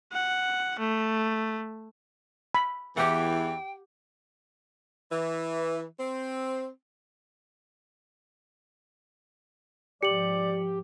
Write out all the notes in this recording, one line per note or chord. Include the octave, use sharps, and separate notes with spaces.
F#5
A3
B5
E2 E3 G4 F#5 G5
E3
C4
G#2 F3 G4 D5 C#7 F#7